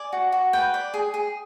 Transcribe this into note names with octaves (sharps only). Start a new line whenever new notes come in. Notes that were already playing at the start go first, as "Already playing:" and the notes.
Already playing: D5 G#5
F#4
F#4
B4 G5
D5
G#4
G#4